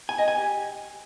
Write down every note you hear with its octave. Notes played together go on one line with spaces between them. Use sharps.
G#5
D#5
G#5
G4